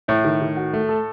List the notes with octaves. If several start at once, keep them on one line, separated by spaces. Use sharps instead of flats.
A2 E4
D#3
D#3
F#4
A3
A4